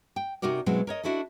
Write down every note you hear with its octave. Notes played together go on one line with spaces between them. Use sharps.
G5
C3 D#4 F#4 A#4 D5
B2 F#3 G#3 C4 E4
A#4 C#5 D#5
D4 E4 F#4 A4 D#5